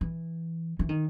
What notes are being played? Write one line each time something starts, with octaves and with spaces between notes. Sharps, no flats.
E3
E3
D#3